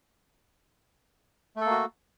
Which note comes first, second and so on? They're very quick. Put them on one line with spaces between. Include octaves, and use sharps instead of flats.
A3 A4 A#3 F#4